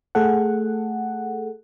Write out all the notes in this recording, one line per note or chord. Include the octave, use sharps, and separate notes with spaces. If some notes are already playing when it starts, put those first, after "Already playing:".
A3 G#4 A4 F#5